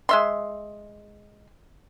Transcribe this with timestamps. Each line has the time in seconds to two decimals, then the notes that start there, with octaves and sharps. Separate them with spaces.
0.09 G#3 E5 C6